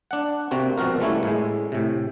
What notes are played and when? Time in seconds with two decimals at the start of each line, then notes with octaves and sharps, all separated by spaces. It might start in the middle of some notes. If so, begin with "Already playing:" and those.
0.11 D4 F#5
0.51 C3 A#3 C4 F#4
0.78 B2 F3 C4 F#4 A#4
1.00 E3 G3 A3 A#3 C#4 E4
1.23 A2 G#3
1.72 A2 C3